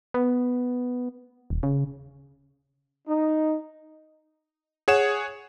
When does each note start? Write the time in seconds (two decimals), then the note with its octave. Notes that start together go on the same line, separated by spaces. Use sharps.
0.14 B3
1.50 D#1
1.63 C#3
3.08 D#4
4.88 G#4 C#5 F#5 E7